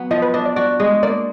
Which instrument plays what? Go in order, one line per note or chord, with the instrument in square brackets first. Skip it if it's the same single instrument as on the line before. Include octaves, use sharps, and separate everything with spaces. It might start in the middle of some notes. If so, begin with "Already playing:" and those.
Already playing: [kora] F#3 B3
[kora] F3 [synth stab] D#5
[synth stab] B4
[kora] D4 [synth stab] D#5
[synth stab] D5
[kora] F#4 [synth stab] D5
[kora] G#3 [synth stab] D#5
[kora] A#3 [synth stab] D5